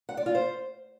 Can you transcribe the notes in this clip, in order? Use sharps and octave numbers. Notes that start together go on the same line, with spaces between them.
F#5
D5
F4
C5